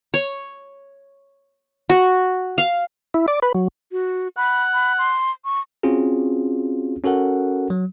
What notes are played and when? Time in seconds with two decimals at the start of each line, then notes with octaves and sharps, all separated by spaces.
0.14 C#5
1.90 F#4
2.58 F5
3.14 E4
3.28 D5
3.42 B4
3.55 F#3
3.92 F#4
4.37 F#5 B5
4.74 B5
4.98 C6
5.45 C#6
5.83 C4 C#4 F4 F#4 G#4
7.04 C#4 F#4 A4 A#4 F#5
7.70 F#3